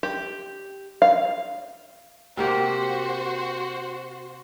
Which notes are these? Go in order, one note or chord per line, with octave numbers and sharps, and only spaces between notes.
G4
F5
C3 A#3 F#4 G4 C5